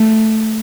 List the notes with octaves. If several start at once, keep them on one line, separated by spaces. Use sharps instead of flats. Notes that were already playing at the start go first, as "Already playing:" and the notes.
Already playing: A3